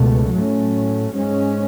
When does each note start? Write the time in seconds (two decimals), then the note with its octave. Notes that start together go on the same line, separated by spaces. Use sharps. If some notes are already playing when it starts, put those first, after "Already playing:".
Already playing: C#2 B2 A3
0.31 A2 F#3 A3 C#4
1.12 G#2 G#3 C#4